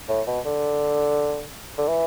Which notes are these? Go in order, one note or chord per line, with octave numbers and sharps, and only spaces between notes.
A2
B2
D3
D3
E3